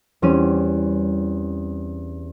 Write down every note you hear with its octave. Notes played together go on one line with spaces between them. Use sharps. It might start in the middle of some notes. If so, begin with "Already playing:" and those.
E2 G3 C4 C#4 D#7